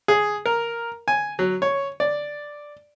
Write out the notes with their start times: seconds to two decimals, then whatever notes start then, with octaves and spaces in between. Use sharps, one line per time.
0.08 G#4
0.46 A#4
1.08 G#5
1.39 F#3
1.62 C#5
2.00 D5